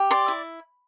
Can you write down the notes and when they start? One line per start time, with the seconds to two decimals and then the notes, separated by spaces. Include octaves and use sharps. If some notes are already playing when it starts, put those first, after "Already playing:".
Already playing: G4
0.11 D5 C6
0.28 E4